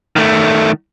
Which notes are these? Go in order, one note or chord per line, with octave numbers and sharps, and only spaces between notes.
D#3 A3